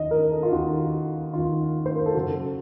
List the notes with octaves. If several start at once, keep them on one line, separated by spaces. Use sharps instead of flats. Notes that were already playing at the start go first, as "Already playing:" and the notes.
Already playing: D#2 D#3 D#5
A#4
A4
F4
D#2 D#3 F#4
D#2 D#3 F4
C5
A#4
A4
F#2 C#3 F#4